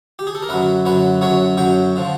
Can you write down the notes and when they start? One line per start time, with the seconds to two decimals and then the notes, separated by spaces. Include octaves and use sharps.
0.19 G4
0.27 G#4
0.35 A4
0.42 A#4
0.49 F#2 D3 F#3 B4
0.85 F#2 D3 F#3 B4
1.21 F#2 D3 F#3 C#5
1.57 F#2 D3 F#3 G5
1.96 D3 F3